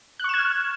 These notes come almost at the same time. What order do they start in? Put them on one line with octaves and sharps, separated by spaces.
F#6 C#6 E7 G#6 F6